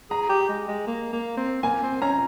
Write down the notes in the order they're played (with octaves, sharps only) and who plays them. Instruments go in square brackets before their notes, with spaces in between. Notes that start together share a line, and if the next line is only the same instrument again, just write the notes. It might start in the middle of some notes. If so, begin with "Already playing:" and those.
[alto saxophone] G#4 [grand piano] A#5
[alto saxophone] G4
G#3
G#3
A#3
A#3
C4
[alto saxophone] A#3 [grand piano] G#5
[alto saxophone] C4
[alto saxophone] C#4 [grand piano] A#5